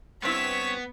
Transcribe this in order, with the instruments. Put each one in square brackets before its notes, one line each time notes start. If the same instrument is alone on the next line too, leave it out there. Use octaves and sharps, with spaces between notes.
[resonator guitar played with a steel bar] G2 C4 E4 [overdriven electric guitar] B3 [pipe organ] C#5 [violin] B6 E7